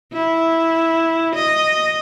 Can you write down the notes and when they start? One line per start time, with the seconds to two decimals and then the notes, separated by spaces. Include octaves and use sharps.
0.13 E4
1.35 D#5